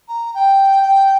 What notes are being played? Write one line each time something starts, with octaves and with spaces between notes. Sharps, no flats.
A#5
G5
G5